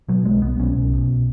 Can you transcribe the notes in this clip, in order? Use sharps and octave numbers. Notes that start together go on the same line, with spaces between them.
B2 F#3
B1 G#3
B1 B3
B1 C#4
B1
B2